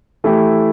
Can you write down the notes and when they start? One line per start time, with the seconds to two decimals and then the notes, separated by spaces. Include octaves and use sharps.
0.24 E3 A3 E4 G4